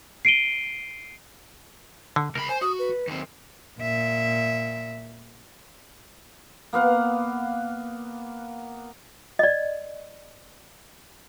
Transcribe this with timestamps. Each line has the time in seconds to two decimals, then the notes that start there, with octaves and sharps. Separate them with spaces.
0.25 C7 D7 D#7 G7
2.16 D3
2.35 C#2 A#4 B5
2.49 C5 G#5
2.61 F#4 D#6
2.79 B4
3.07 D#2 C4
3.79 A#2 E5
6.73 A#3 B3 F5 F#5
9.39 D5 D#5